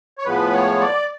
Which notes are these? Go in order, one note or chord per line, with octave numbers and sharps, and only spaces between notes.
C#5
A2 F3 G#3 B3 B4
C#5
D5